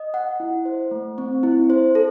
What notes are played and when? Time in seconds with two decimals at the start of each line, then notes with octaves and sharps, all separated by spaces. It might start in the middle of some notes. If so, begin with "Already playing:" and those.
Already playing: D#5
0.14 F#5
0.40 E4
0.65 C5
0.91 A3
1.18 C4
1.43 E4
1.70 C5
1.95 A4